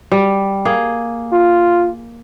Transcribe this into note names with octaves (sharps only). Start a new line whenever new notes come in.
G3
A#3 G#4
F4